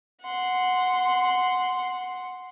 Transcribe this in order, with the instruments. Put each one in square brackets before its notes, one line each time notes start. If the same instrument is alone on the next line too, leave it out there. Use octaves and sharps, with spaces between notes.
[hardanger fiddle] F#5 C6